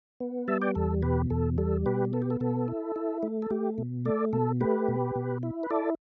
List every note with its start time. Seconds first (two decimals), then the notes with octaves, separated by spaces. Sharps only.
0.20 B3
0.48 G3 E5 A5
0.61 D5 G5
0.75 E2 A4
1.03 B2 G4 B4
1.30 E2 A4
1.58 G3 A4
1.86 B2 G4 B4
2.13 B3 A4
2.22 G4
2.30 A4
2.40 B2 A4
2.68 E4
2.96 E4
3.23 A3
3.42 A4
3.51 A3 G4
3.78 B2
4.05 A3 A4 D5
4.33 B2 A4
4.61 A3 G4 B4
4.88 B2
5.15 B2
5.43 E4
5.63 B4
5.71 E4 A4 D5